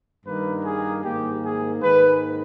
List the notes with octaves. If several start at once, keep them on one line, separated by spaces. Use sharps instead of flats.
G2 D#3 G3 A#3 B4
G#4
G#2 D#3 A#3 G4
G#4
G#2 D#3 A#3 B4